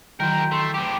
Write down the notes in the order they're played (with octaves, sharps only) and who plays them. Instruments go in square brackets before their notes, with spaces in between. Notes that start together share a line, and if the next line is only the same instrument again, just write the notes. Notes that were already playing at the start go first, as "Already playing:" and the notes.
[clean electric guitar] D#3 E3 F#3 [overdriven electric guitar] A#4 C5 [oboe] G5
[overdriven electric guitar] A3 [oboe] C6
[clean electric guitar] E2 [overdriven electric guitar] A2 G4 [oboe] D6